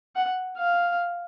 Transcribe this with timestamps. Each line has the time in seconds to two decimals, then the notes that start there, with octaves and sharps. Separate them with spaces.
0.16 F#5
0.58 F5